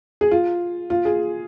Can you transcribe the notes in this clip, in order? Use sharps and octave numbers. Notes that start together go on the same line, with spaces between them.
G#4
F4
F4
G#4